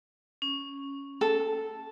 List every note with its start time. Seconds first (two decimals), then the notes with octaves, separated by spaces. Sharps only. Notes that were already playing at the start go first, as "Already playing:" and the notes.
0.42 C#4
1.21 A4